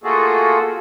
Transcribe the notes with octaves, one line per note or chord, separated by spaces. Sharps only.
A3 A#3 F4 F#4 G#4 A4